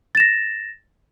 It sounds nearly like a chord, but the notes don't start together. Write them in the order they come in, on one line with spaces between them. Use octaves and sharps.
A6 E7 A#6